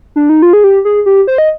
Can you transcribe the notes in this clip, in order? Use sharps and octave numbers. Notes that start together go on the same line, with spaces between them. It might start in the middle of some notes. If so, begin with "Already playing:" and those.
D4
D#4
F4
G#4
G4
G#4
G4
C5
D#5